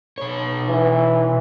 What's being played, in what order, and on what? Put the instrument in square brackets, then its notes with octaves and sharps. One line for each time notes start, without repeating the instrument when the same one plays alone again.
[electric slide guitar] B2 C#5
[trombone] E3